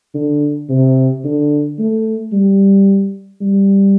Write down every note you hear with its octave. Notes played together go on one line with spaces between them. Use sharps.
D3
C3
D3
A3
G3
G3